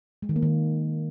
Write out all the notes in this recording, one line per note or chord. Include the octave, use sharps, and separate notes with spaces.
G#3
D#3
A#3
D#3